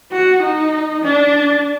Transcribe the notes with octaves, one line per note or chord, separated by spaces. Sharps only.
F#4
D#4
D4